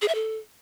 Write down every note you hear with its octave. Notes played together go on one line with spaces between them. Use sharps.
G#4
E5
A4